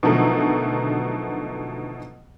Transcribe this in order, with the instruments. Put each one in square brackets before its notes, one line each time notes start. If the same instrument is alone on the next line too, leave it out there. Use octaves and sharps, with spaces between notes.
[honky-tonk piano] B2 D3 D#3 F3 F#3 A3